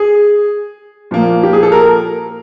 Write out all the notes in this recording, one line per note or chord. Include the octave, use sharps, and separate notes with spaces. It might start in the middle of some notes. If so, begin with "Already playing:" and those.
Already playing: G#4
A#2 F3 A#3
G4
G#4
A4
A#4